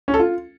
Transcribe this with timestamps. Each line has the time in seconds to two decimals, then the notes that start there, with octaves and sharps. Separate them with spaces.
0.08 C#4
0.14 A4
0.20 F4